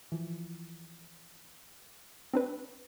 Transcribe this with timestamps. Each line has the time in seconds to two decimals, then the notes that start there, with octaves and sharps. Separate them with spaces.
0.12 E3 F3
2.33 C4 D4 B4